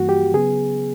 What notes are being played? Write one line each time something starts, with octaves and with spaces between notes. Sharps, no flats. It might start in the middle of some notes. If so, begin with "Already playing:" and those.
Already playing: G2 E3 G3 A#3 F#4
G4
C#3 F#3 B3 G#4